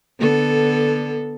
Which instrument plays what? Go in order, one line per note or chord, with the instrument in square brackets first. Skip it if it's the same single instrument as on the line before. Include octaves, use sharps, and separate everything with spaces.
[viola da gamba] D3 B3 A4